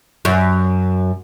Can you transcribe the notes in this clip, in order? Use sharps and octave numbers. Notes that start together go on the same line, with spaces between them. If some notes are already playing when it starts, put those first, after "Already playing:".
F#2